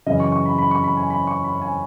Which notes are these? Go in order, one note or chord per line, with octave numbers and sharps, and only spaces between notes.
F#2 C#3 E3 D#5
C#6
C#6
B5
B5
C#6
B5
G#5
B5
C#6
B5
G#5